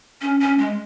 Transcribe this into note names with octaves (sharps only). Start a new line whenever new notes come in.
C#4
C#4
G#3